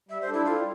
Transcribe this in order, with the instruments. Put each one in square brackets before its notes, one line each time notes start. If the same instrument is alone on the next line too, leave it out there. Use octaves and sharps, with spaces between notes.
[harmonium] G3 [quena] E5
[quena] C5
[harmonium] D4 A4
[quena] E4
[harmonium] G3 [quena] F4